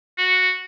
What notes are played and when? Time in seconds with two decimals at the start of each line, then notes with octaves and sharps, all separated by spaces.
0.18 F#4